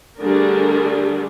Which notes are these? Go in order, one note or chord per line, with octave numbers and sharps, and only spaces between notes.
D3 G3 A3 D4 G#4 A#4